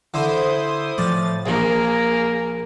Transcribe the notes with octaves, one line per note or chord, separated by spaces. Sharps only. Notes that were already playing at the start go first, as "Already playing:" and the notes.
D3 E4 C5 D#6
A2 F3 D5 A6
A#1 A#2 A#3 G#4